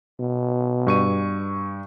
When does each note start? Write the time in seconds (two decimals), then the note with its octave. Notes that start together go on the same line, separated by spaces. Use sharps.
0.20 B2
0.87 G2 C#6 D#7